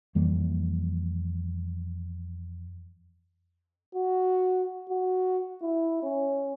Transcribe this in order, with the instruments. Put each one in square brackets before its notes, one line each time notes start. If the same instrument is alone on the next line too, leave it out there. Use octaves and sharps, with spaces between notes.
[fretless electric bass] F2 E3 G3 A#3
[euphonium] F#4
F#4
E4
C#4